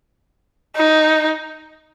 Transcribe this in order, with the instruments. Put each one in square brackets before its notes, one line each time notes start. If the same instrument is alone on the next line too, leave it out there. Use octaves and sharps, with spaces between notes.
[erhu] D#4